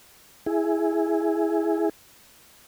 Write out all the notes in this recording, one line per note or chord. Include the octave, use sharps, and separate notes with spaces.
E4 G#4